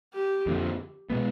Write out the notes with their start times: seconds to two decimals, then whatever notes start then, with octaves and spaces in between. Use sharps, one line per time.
0.14 G4
0.46 F2 D3 F3
1.10 B2 G#3 B3